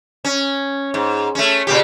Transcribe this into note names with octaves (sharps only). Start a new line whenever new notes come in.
C#4
G#2
A3 C#4
A#2 C#3 G4